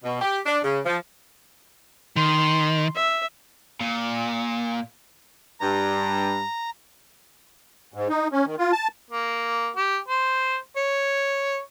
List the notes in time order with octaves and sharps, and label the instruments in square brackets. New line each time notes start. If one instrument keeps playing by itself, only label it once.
[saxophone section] B2
G4
D4
C#3
F3
[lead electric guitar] D#3 [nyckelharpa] C6
[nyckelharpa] E5
[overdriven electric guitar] A#2
[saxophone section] G2 [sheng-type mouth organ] A#5
[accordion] G#2
D#4
C#4
D#3
F4
A5
[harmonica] A#3
G4
C5
C#5